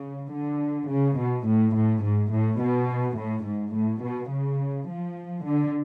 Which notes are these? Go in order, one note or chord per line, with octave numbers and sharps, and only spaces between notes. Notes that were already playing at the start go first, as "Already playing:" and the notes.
Already playing: C#3
D3
C#3
B2
A2
A2
G#2
A2
B2
A2
G#2
A2
B2
C#3
F3
D3